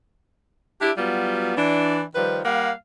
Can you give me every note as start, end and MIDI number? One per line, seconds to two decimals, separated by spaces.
0.81 0.91 62
0.81 0.91 64
0.81 0.91 67
0.98 1.53 54
0.98 1.53 55
0.98 1.53 59
0.98 1.53 65
1.57 2.03 52
1.57 2.03 62
2.15 2.40 51
2.15 2.40 53
2.15 2.40 55
2.15 2.40 71
2.45 2.72 55
2.45 2.72 58
2.45 2.72 77
2.45 2.72 78